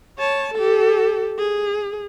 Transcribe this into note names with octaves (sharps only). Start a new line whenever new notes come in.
C#5 A5
G4 A4
G#4